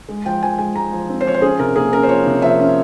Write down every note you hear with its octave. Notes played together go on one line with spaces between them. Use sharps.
G#3
F3 G5
F3 G#5
G#3 G#5
G#3 A#5
F3
C4
C5
F3 C#5
C5
C#4 G#4
C3 A#4
A#3 G#4
C#4 A#4
C5
F3 C#5
C3
F3 E5
C#4